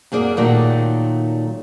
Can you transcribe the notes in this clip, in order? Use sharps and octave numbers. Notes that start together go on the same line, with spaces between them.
F#2 A#3 G#4 D5
A#2 D#3 F#3 A3 A#4 D5